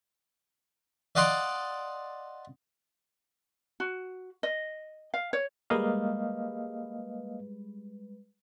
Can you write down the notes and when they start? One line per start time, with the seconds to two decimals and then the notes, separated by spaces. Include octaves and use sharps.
1.15 D5 D#5 F5 F#5 C6 D6
3.80 F#4
4.43 D#5
5.14 F5
5.33 C#5
5.70 G3 G#3 A#3 B4 D#5 F5